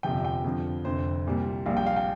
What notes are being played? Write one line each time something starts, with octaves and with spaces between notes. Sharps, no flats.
G1 F2 C3 F3 G5
G5
F2 D3 F3
F1 F2 D3 C5
C2 A#2 G3
A#1 A#2 G3 F5
G5
F5
G5